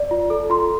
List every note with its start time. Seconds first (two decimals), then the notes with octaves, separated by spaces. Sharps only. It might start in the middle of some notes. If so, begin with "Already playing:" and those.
Already playing: D5
0.11 F4
0.30 A4
0.50 F4 C6